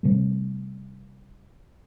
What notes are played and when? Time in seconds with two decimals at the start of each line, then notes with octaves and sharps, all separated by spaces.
0.03 C3 G3 A3